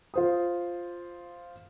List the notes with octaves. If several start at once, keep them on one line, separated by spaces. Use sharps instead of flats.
F4 C5 D#6